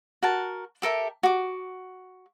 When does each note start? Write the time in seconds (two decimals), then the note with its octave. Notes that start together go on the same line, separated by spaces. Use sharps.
0.23 F#4 A#4 A5
0.82 G4 A4 A#4 E5
1.23 F#4 D6